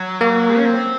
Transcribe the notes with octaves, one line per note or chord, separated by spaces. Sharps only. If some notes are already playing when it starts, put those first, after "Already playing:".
Already playing: F#3
A#3
C#4
C4